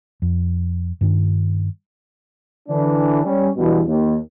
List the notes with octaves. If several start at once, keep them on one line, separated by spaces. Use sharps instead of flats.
F2
G2 D#3 D4
D3 E3 D4
G3 C#4
E2 G2 B2
D#2